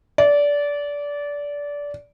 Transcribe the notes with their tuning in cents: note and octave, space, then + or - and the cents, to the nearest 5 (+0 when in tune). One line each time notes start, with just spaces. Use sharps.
D5 -20